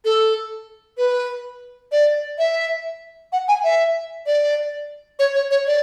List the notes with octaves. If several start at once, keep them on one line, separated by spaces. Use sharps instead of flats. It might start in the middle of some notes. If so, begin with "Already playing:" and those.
A4
B4
D5
E5
F#5
G#5
E5
D5
C#5
C#5
C#5
D5